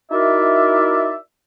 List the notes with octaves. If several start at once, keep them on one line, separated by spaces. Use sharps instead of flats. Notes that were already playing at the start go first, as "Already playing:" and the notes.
D#4 E4 F#4 A#4 D5 E5